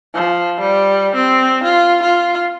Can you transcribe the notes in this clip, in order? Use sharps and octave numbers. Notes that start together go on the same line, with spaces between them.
F3
G3
C4
F4
F4